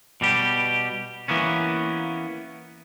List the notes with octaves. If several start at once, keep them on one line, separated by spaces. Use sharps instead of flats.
B2 G3 G4
E3 A#3 B3 C#4